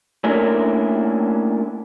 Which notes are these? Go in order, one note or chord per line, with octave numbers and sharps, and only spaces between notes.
A3 A#3 C#4 D4 E4 A#4